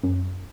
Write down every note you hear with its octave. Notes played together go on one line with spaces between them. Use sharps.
F#2